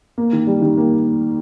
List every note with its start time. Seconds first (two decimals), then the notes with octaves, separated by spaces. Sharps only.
0.18 A#3
0.33 D#3
0.47 G3
0.62 D#3
0.77 A#3